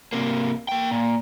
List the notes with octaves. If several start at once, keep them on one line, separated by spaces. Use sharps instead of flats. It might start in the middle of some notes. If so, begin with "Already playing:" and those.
C3 A#3
A#3 G5
A#2